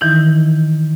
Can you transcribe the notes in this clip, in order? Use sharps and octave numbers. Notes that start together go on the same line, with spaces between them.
D#3 E3 D#4 E4